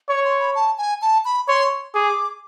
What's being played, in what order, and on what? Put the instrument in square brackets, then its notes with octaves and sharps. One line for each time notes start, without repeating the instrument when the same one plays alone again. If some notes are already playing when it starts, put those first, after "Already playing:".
[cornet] C#5 [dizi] C#6
[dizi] C6
B5
A5
G#5
A5
B5
[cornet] C#5 [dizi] C6
[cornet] G#4 [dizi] D6